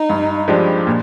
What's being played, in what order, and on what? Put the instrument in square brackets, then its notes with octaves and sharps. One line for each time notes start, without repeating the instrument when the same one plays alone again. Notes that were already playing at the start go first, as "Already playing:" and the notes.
Already playing: [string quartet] D#4
[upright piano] G2
F3 G#3 D4 G4
A#2